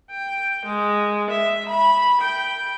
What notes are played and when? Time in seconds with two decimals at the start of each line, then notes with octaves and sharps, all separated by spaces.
0.11 G5
0.65 G#3
1.31 E5
1.69 B5
2.21 G5